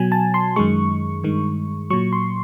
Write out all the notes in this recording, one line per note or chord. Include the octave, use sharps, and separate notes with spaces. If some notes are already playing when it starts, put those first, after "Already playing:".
Already playing: B2 F#3 G#5
A5
C6
F#2 D#3 G#3 C#6
G2 D#3 G#3
A#2 F#3 C#6
C6